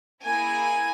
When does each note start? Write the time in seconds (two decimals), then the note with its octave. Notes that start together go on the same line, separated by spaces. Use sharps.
0.24 A#3 E4 G#4 G#5